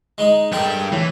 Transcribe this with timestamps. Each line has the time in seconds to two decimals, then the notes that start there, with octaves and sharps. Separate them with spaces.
0.18 G#3 D#4
0.52 G2 G#3 A4 A#4 G5
0.92 A2 E3